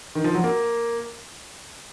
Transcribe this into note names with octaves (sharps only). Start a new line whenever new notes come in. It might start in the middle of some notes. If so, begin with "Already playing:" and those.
D#3
F3
F#3
A#3